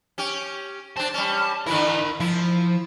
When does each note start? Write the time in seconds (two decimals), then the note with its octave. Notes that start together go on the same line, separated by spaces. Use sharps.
0.18 C#4 G4
0.96 C4 D4 A5
1.14 G3 C#4
1.66 D3 E3 E4 A#4 B5
2.20 F3 E4